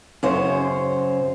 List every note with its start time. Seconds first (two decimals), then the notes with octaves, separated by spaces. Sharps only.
0.23 F#2 C#3 C5 C#5